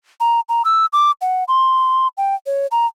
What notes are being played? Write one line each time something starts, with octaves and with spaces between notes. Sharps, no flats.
A#5
A#5
E6
D6
F#5
C6
G5
C#5
A#5